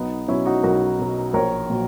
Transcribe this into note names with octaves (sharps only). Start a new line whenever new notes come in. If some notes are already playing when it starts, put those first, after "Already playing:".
Already playing: B1 B3 D#4
B2 F#3 C#4 E4
D#4 F#4
B1 F#4 A#4
B2 F#3
A#1 A#4 C#5
A#2 F#3